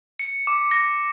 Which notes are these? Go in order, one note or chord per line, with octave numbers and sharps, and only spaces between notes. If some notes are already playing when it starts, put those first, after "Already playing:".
C#7
D6
A#6